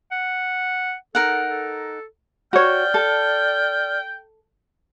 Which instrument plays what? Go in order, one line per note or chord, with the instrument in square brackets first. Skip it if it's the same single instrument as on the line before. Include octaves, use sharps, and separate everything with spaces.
[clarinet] F#5
[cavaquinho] D#4 A#4 F#5 [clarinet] A4
[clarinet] A4
[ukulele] F#4 C#5 [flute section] D5 F6 [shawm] G5
[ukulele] A4